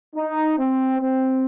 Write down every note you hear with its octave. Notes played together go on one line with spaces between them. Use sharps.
D#4
C4
C4